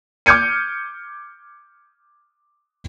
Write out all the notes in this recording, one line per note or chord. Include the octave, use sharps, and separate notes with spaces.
D6 F6 G6 G#6 C#7 D#7